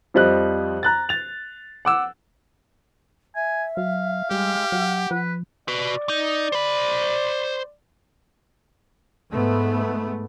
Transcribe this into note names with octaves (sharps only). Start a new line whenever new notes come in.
F2 F3 G3 D#5 F#6
A#5 F#6 A6
A6 F7
F#5 D6 E6
E5 G#5
F#3 F5
G3 G#3 G4
F#3 F#5
F3 B4
F#4 B4 D5
D#4
C5 B5
G#2 A3 B3